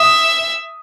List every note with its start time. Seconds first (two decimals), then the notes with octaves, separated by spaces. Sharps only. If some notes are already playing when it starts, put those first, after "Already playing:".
Already playing: E5 D#6